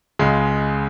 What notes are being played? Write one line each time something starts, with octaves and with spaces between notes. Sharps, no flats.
C#2 C#3 G#3